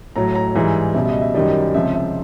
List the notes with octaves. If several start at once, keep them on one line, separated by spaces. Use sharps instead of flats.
A2 F#3 A#5
A#5
G#2 E3 G3
C#2 B2 G3 E5
E5
D#5
E5
F#2 D#3 G3 D#5
C#2 C3 F3 E5
E5